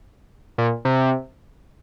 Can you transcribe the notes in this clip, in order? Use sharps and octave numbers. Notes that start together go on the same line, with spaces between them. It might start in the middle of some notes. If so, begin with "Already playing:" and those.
A#2
C3